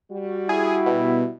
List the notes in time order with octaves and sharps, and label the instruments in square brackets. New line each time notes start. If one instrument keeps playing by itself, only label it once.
[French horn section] G3 F#4
[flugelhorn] E4 [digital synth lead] G#4
[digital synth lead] B2